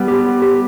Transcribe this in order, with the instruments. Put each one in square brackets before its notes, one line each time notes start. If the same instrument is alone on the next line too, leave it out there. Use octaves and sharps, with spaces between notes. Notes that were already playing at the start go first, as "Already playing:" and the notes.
Already playing: [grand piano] G3 B3
[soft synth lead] G4
G4